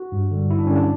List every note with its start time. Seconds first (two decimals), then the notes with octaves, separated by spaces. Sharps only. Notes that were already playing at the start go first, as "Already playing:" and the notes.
Already playing: F#4
0.12 G2
0.31 D3 G3
0.50 G2 E4
0.58 D4
0.67 D3 G3 C#4
0.75 D4